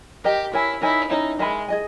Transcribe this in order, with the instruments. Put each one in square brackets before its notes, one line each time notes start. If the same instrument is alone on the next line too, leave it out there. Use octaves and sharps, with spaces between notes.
[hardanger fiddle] G4 [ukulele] A#4 D#5 G5
[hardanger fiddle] E4 [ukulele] A#4 C#5 G#5
[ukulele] D#4 A#4 C#5 G#5 [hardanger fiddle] E4
[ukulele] C#4 E4 A#4 E5 [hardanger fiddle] D#4
[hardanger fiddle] G#3 [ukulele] A#4 E5 G#5 B5
[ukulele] G#4 D#5 G#5